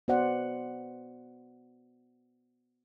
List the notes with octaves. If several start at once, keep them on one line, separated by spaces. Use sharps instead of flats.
B3 F#4 C5 D5 F#5